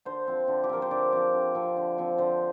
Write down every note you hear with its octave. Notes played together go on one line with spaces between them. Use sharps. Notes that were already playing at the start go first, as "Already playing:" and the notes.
D3 C5
F3 C4
D3
G4
F3 C4 A#4
C5
D3 D5
F3 C4 D5
D3
F3 C4
D3
F3 C4
D3 C5